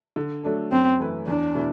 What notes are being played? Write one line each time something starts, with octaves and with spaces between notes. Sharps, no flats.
D3
F#3 A3 D4 A4
F#2 C4
E3 A3 E4 B4
E2 D4
B2 A3 E4